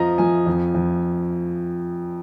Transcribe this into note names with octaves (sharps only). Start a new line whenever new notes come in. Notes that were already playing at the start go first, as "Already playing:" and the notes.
Already playing: F2 F3 D#5 A#5
F3 G#5
F2
F2